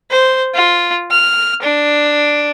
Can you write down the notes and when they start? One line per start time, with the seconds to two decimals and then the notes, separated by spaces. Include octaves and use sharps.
0.11 C5
0.54 F4
1.11 F6
1.62 D4